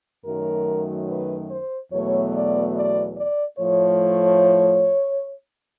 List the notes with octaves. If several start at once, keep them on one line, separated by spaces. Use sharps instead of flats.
F#2 D#3 F#3 A3 A#4
B4
C5
E2 B2 F#3 A3 C#5
D5
D5
D5
A2 F3 A3 C#5